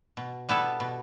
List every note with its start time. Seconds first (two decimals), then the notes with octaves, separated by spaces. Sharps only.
0.17 B2
0.49 G3 B3 E4 A4
0.80 B2